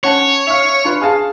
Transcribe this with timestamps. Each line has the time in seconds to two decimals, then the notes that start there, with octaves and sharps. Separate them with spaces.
0.04 C#4 C#5 F#5 A5
0.47 E5 F5
0.84 D4 F4 B4
1.01 G#4 F5 A5